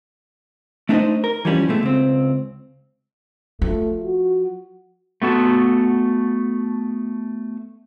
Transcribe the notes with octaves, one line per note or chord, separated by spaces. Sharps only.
A3 D4 D#4 G#4 C5 D#5
A#4
E3 F3 G3 C#4
B2 G#3 A3
C#2 C4
F3 A3
F#4
A3 B3 F#4 A4